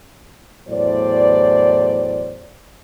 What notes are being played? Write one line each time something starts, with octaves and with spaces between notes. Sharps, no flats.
E2 A2 F#3 C5 D5